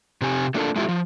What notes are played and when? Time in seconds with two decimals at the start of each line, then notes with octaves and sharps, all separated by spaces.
0.21 C3 C4 G4 G#5
0.54 A3 A#3 D4 F4 A4 A#4
0.76 G#3 A3 E4 F4 G4
0.88 F3